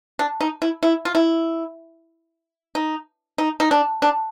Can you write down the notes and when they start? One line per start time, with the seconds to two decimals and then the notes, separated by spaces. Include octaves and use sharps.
0.19 D4
0.41 D#4
0.62 E4
0.83 E4
1.05 F4
1.15 E4
2.75 D#4
3.38 D#4
3.60 D#4
3.71 D4
4.02 D4